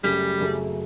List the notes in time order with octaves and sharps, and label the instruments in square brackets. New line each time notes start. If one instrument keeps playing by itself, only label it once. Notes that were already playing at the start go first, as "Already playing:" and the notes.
[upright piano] F#2 C#3 F#3 A3 [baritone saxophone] G3
[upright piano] F#2 C#3 F#3 A3